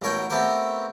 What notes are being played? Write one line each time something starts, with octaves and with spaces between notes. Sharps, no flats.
A1 B2 A#4 C#5 G5
A3 B3 C4 G4 A#4